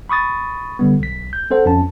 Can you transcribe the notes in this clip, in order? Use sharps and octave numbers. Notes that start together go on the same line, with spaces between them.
B5 C#6 D#6 A6
D3 G3 B3
B1 B6
G6
C4 A4 C5 F#5
F2 C#4 A5